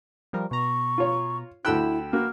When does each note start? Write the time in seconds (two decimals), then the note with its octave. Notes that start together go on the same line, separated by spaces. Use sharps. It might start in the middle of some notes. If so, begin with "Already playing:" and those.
0.33 F3 G3 A#4
0.51 B2 A#5 C#6
0.98 F4 C#5
1.65 D2 E4 A4 G5 B5 E6 F#6
2.13 A#3 F#4 F6